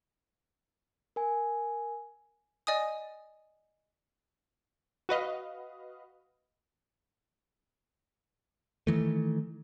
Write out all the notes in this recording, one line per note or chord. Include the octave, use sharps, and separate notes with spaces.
A#4 G#5
D5 D#5 G#5 D#6
F#4 B4 D#5 F5
D#3 E3 A3